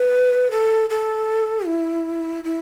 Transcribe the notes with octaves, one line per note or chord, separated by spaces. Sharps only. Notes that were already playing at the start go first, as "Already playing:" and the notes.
Already playing: B4
A4
A4
E4
E4